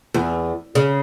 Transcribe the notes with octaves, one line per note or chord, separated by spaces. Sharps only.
E2
C#3